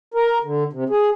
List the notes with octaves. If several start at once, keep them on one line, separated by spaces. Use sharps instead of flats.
A#4
D3
C3
G#4